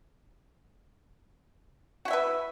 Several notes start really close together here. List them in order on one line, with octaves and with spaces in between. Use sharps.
F#4 E4 E5 B4